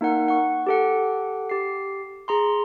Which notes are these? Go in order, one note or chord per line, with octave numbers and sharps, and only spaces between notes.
A#3 D#4 A#4 F#5
F#5 C#6
G4 A4 F#5
G4 C7
G#4 A#5 C6